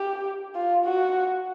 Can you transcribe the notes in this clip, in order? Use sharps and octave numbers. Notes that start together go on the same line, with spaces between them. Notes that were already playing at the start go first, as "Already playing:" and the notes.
Already playing: G4
F4
F#4